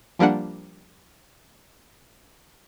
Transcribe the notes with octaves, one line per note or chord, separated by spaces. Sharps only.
F3 G3 A#3 D4 F#5